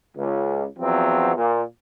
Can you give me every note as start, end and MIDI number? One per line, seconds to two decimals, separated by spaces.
0.16 0.64 37
0.78 1.32 40
0.78 1.32 53
0.78 1.32 54
0.78 1.32 60
1.35 1.62 46